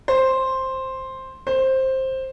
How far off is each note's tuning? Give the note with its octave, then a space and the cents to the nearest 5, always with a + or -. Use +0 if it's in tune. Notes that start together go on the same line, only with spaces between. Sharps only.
C5 +5
C5 +10